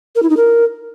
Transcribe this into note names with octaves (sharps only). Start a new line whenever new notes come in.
A#4
E4
D#4
A#4